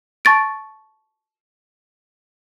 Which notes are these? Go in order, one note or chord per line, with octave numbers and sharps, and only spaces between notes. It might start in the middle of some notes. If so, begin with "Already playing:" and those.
A5 C#6 A6 D7